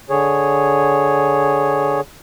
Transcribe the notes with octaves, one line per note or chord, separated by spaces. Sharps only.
D3 G#4 C#5